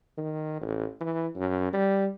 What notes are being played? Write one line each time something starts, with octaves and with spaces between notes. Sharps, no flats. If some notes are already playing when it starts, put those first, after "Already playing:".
D#3
A1
E3
F#2
G3